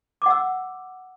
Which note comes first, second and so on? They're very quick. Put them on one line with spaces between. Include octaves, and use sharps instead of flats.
D6 F#5 E6